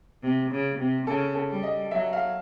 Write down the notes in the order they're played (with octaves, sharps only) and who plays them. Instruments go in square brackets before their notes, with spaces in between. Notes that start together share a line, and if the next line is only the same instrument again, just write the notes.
[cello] C3
C#3
C3
[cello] C#3 [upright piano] A4
[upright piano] A4
[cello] G3
[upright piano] D#5
[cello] F#3 [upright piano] E5
[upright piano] F5